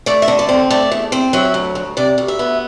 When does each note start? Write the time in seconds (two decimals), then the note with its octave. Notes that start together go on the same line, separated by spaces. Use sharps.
0.06 A3 D5
0.22 E5
0.28 D3
0.39 D5
0.49 C4
0.70 A3 D5
0.92 E2
1.12 C4
1.33 F#3 E5
1.54 D2
1.75 D2
1.97 C3 D5
2.18 D2
2.28 E5
2.39 B3